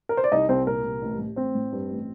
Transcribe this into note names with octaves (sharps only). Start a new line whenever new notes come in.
A#4
C5
D5
C2 D#4 D#5
C2 C4 C5
A#2 A#4
C2
A1
A2
A1 C4 C5
A2
G2
A1